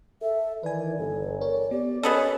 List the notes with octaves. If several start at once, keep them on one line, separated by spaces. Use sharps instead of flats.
A4 E5
D#3 E3 B4 D5 G#5
G1 A4
A#4 C#5 D5
B3 G4 D5
B3 C#4 G#4 A4 D#5 B5